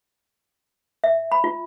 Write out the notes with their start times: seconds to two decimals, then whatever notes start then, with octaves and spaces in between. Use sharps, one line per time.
1.04 E5
1.32 B5
1.44 F4